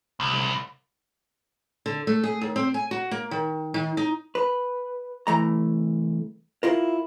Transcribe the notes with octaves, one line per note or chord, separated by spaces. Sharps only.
C2
D3
A3
G#4
D#2
C4
G#5
F#4
A#3
D#3
D#3
D#4
B4
C2 E3 A3 A#5
E4 F4 A#4